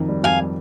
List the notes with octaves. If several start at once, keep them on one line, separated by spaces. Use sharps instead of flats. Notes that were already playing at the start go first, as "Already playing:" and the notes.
Already playing: F2 D#3
G3
F2 F5 G#5
G3